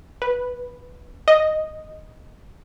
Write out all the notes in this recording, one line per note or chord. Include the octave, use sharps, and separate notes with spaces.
B4
D#5